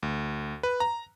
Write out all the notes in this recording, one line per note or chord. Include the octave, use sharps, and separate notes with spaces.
D2
B4
A#5